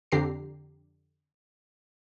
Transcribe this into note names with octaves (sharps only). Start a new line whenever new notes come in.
F2 D3 G4 A#5 C7